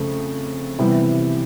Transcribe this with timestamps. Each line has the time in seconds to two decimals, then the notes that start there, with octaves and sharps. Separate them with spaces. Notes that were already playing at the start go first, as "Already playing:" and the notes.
Already playing: F2 C#3 A3
0.78 C3 E3 G3 B3 E4